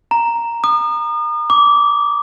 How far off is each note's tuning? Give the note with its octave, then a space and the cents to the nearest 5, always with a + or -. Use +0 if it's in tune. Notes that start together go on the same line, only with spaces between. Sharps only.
A#5 +0
D#6 -40
D6 -20